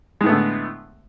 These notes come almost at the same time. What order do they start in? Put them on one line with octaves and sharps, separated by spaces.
G#3 A2 B3 A3 D3